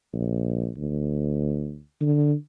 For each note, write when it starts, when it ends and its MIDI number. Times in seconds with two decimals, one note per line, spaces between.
0.13 0.70 34
0.77 1.80 38
2.01 2.34 50